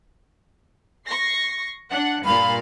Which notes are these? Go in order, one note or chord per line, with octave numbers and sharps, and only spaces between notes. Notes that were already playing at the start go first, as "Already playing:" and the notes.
C#6 A#6 C7
D4 F#5
G2 A#2 F5 B5